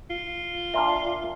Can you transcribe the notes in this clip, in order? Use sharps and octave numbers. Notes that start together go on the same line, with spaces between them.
F4
A#2 D4 E5 C6 F6